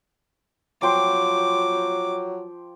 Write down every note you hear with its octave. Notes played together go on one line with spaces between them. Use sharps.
F3 F#3 G5 C6 D6